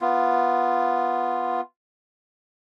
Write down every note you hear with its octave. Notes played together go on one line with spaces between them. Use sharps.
B3 F4